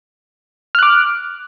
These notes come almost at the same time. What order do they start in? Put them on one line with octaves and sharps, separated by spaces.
F6 F#6 D6